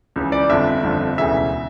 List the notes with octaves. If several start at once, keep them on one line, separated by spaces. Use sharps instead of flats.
C#2 C#3 E3
D5
G1 F2 D3 F3 E5
G1 F2 D3 F3
E1 D2 C#3 E3 E5